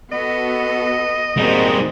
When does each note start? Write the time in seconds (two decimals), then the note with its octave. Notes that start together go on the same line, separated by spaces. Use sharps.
0.12 B3 F#4 A4 D#5
1.37 G3 G#3 A#3 C4 D#4 F#4